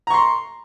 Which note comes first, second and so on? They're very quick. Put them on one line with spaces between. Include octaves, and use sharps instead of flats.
A#5 C#6 C6